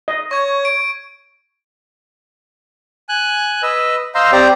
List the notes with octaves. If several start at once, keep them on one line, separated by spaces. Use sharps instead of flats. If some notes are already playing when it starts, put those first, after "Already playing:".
D#5
C#5 C#6 G#6
D7
G#5 F#6
B4 D#5 E6
C5 D#5 F5 A#5 C6 E6
C4 G4 C5 D5 A#5